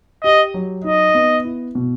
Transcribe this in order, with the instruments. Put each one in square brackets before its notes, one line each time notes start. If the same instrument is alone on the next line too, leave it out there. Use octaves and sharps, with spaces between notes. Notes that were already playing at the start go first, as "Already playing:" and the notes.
[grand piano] G4 [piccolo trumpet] D#5
[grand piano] F#3
[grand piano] D#4 [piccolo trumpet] D#5
[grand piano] B3
E4
B2